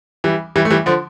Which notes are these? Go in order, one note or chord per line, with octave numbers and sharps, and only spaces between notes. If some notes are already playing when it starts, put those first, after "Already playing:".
E3 G3
E3 G3
A3
E3 G3
D3 F3